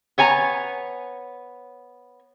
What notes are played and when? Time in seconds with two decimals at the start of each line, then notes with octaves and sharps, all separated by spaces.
0.18 B3 C#5 G#5 A#5